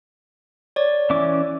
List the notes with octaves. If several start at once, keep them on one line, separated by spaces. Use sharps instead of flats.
C#5 D5
E3 C#4 D6